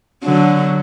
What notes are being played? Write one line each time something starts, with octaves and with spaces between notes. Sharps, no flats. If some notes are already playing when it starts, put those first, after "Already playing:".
D3 F#3